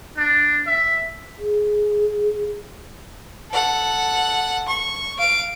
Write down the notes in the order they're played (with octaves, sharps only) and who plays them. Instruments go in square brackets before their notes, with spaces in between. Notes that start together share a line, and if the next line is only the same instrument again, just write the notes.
[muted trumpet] D4
E5
[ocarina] G#4
[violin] A4 F#5
C#6
F5 D7